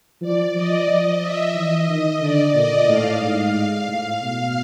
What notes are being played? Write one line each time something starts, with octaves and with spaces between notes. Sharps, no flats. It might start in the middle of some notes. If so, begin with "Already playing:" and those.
F3 D5
F3 D#5
F3
E5
E3 D#5
D#3 D#5
D3 D5
A#2 D#5
A2 F5
G#2
F5
A2 F5
B2 F5